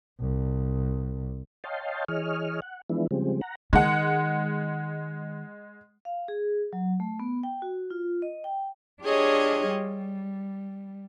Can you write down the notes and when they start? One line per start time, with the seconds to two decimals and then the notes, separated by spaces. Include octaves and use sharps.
0.21 C2
1.64 C#5 D#5 F5 G5 A5 C6
2.08 E3 G#4 C#5 D#5 F6
2.62 F#5
2.90 E3 F3 G#3 B3 D4 E4
3.11 C#3 F3 G3 G#3 C4
3.41 F#5 A#5
3.73 D#3 G#3 F#5
6.05 F5
6.28 G#4
6.73 F#3
7.00 A3
7.19 B3
7.43 G5
7.62 F#4
7.90 F4
8.22 D#5
8.44 G5
9.02 D4 F4 G4 G#4 C#5 D#5
9.68 G3